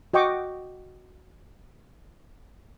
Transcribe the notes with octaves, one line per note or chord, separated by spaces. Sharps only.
F#4 D#5 G5 C#6 D6